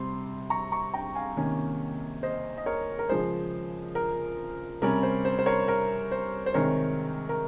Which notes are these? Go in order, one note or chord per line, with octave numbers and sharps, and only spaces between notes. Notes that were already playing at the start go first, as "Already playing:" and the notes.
Already playing: C3 G3 C4 C6
A#5 C#6
A#5 C#6
G5 A#5
F5 G#5
C3 D#3 A#3 C#4
C5 D#5
D#5
A#4 C#5
A#4
C#3 F3 G#3 C5
A#4
C3 G3 C#4 A#4
C5
C5
C5
A#4 C#5
A#4
C5
C5
C3 D#3 G#3 C4 A#4 C#5
A#4